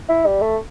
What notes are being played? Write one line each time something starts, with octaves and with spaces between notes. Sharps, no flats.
E4
G3
A3